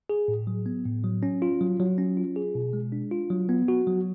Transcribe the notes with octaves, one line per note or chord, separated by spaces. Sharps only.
G#4
A2
F#3
B3
A2
F#3
C#4
F4
F#3
F#3
C#4
F4
G#4
B2
G#3
D4
F4
F#3
B3
F#4
F#3